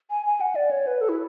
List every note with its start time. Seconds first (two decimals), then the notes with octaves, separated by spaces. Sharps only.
0.10 G#5
0.26 G#5
0.41 F#5
0.56 D5
0.71 C#5
0.87 B4
1.01 A4
1.09 E4